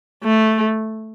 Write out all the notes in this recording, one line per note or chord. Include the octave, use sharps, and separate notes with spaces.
A3